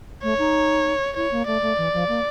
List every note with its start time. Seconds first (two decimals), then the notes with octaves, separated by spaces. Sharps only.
0.23 A3 C#5
0.39 D#4
1.16 E4 C#5
1.32 A#3
1.47 A3 D5
1.62 A3
1.78 E3
1.93 F3
2.09 A#3